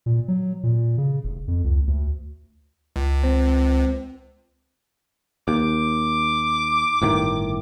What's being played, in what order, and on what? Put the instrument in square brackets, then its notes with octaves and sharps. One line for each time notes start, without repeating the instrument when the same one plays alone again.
[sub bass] A#2
F#3
A#2
C#3
F1
F2
C#2
D2
[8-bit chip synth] C#2
[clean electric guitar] C4
[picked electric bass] D#2 [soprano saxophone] D6
[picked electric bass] G1 A2 D#3